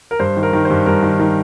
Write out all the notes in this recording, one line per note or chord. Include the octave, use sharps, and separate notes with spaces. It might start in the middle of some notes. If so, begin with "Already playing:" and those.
A#4
G2 C5
D#3
A#4
D#3
C5
G2
G2 A#4
D#3
D#3